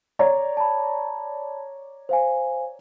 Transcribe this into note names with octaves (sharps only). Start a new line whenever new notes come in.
C#5 D5 A#5
A5 B5
C5 F5 G#5